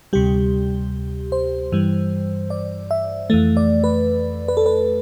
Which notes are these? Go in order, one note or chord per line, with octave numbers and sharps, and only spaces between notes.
D2 C3 G3 G4
C5
G2 E3 G3
D5
E5
F2 E3 A3
D5
B4
B4
A4
B4